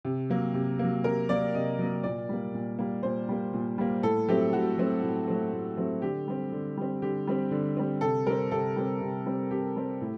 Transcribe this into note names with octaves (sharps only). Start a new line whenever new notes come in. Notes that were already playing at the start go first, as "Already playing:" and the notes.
C3
F#3 A#3
C3
F#3 A#3
C3 A#4
F#3 A#3 D5
C3 D#5
F#3 A#3
A#2 D5
G3 A#3
A#2
G3 A#3
A#2 C5
G3 A#3
A#2
G3 A#3
A2 A4
F#3 A3 C4 G4
A2 F#4
F#3 A3 C4
A2
F#3 A3 C4
A2
F#3 A3 C4
D3 G4
G3 C4
D3
G3 C4
D3 G4
G3 C4
D3
G3 C4
C3 A4
G3 C4 A#4
C3 A4
G3 C4
C3
G3 C4
C3 G4
G3 C4
A2